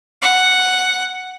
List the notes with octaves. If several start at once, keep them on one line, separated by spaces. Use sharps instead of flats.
F#5